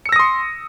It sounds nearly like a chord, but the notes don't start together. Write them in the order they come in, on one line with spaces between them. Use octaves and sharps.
C#7 E6 A#6 D#6 C6